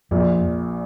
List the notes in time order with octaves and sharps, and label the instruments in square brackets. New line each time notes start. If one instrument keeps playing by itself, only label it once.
[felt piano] A#1 A#2 [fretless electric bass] F2